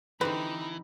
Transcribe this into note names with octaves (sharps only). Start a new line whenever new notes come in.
D3 E3 G3 C4 D#4 B4 B5